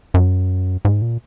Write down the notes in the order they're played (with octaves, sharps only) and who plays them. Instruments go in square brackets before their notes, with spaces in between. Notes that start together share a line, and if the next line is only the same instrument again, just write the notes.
[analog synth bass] F#2
G#2
A#2